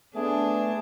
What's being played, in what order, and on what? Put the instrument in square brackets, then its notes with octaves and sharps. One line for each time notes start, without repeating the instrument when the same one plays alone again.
[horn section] A3 B3 G#4 [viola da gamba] D4